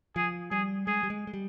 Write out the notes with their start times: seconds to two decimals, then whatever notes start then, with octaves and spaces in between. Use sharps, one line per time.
0.16 F3 G#4
0.51 G3 G#4
0.87 G#3 G#4
1.03 G3
1.10 G#3
1.27 G#3
1.34 G3